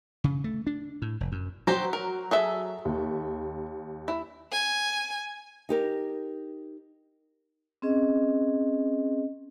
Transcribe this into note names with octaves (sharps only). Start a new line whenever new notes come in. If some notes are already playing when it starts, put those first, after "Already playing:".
C#3
A3
D4
A2
F1
F#2
F#3 G4 C5 A#5
A#4
G#4 A4 E5
D#2
E4
G#5
D#4 G4 A#4
C4 C#4 G#4 D#5